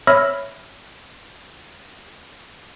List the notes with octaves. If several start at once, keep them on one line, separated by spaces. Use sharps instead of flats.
C#5 E5 B5 E6 F6 A#6